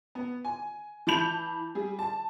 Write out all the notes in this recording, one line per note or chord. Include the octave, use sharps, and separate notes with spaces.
B3
G#5
E3 A5 B5 G6 F7
G3 G#4
A5